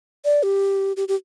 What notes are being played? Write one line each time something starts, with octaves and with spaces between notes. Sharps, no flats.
D5
G4
G4
G4